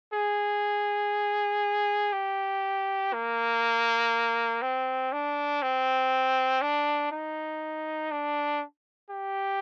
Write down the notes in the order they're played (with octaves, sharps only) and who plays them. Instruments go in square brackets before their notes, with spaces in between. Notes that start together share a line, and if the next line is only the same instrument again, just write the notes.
[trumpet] G#4
G4
A#3
C4
D4
C4
D4
D#4
D4
G4